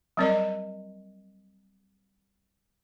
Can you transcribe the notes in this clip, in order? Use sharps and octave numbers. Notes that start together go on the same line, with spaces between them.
F#3 G3 C4 A#4 D5 D#5